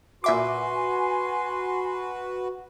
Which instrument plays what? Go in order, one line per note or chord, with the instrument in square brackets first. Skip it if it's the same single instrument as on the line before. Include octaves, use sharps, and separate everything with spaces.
[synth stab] A#2 E5 D6 [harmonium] F#4 B4 [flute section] G#5 [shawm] C6